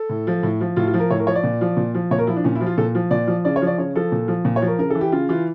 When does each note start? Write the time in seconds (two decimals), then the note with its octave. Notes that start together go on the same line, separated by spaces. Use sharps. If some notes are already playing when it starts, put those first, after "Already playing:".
Already playing: A4
0.09 A2
0.27 F3
0.43 A2
0.61 F3
0.76 A2 F4
0.87 F4
0.94 F3
0.99 A#4
1.11 A2 C#5
1.19 A#4
1.27 F3 C#5
1.36 D5
1.44 A#2
1.61 F3
1.77 A#2
1.95 F3
2.11 A#2 C#5
2.19 A#4
2.27 F3 E4
2.36 D4
2.44 A#2 C#4
2.56 E4
2.61 F3
2.66 F4
2.78 A#2 A4
2.95 F3
3.11 A#2 D5
3.27 F3
3.45 C#3 D5
3.56 C#5
3.62 F3
3.67 D5
3.78 C#3 C#5
3.95 F3 A4
4.12 A#2
4.28 F3
4.45 A#2
4.56 C#5
4.62 F3
4.67 A#4
4.79 C#3 A#4
4.90 A4
4.95 E3
5.01 G4
5.12 C#3 F4
5.29 E3 F4